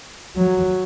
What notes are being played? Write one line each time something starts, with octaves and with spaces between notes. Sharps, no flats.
F#3